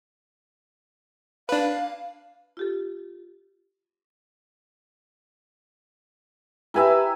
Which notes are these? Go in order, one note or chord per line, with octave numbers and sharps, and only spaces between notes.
D4 B4 F5
F4 G4 A4
E4 G4 B4 E5 G#5 A#5